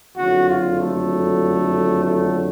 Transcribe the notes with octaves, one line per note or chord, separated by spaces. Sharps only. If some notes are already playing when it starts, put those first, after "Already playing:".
F#1 F2 D3 F#3 F#4
F4
A3
A3